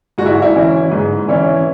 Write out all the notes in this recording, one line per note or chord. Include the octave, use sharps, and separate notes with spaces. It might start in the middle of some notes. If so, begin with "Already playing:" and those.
G#2 F#4
E4
E4
E3 C#4 E4
G#2
E3 C#4 E4